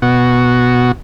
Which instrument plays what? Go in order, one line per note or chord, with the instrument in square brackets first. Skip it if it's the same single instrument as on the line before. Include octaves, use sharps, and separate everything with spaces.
[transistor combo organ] B2 F#4